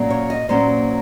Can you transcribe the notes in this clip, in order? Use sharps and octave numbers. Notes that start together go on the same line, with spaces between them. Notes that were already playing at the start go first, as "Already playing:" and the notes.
Already playing: A#2 F#3 A#3 C#4
C#5
D#5
A#2 F#3 A#3 C#4 C5